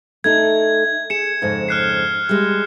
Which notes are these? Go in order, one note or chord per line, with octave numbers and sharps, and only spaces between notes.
A3 D#4 A4 G#6
G#4 C#7 E7
F2 G#2 C#3
F6 F#6 C7
G3 G#3